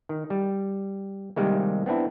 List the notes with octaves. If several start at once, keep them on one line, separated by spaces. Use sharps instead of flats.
D#3
G3
C3 D#3 G3 G#3 A#3
B3 C4 D4 E4